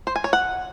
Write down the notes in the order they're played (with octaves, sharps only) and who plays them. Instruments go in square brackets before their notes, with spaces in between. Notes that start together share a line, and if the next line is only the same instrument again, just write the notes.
[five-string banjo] C5
G#5
C#5
F#5